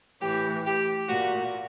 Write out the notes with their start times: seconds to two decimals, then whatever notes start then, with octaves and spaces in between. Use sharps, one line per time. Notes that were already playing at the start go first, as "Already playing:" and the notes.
0.21 A2 E3 G4
0.65 G4
1.08 A#2 F#4